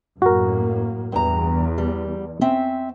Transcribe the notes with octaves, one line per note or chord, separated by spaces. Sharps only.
F#2 A2 A#3 F#4 A#4
E2 G2 E3 A#5
G3
C4 C#4 E5